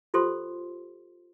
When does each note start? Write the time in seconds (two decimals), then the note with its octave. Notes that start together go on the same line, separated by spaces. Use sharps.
0.14 F4 G4 A4 C5 C6